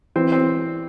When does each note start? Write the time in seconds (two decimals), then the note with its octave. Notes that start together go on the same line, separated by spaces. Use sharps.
0.16 E3 C4
0.32 C4